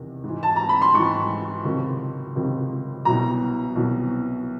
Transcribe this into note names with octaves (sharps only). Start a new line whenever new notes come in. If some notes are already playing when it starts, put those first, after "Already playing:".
Already playing: E2 C3 D#3
G#2
E3
A5
A#5
B5
C6
G#2 E3 C#6
C#2 C3 D#3 F#3
C#2 C3 D#3 F#3
C2 B2 F#3 A#5
C2 B2 F#3